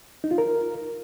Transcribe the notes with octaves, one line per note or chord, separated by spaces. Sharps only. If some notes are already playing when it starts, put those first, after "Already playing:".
D#4
F4
A#4